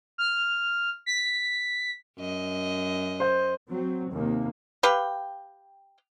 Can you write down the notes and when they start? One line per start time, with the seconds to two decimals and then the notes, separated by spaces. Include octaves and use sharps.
0.18 F6
1.06 B6
2.18 F#2 D#5
3.20 C5 G6
3.71 F#3 C4
4.13 D#2 C3 A#3
4.83 G4 B4 F5 G5